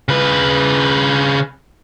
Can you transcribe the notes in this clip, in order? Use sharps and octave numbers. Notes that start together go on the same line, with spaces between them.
C#3 B4